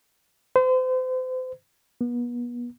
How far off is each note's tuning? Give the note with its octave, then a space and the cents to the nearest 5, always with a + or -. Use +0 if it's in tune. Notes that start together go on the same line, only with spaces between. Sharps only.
C5 -35
B3 -35